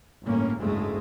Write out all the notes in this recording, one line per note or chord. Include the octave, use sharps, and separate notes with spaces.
G1 A2 A#3 C#4
F#1 D2 G#2 C#3 G#3 A3